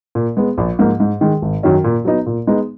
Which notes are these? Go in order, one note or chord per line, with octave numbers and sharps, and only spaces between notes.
A#2
G#3 B3
A#1
G#2 F3 A#3
G#2
D#3 G#3
G#1
F#2 D#3 F#3 C#4
A#2
F#3 B3 D#4
A#2
G#3 B3 D#4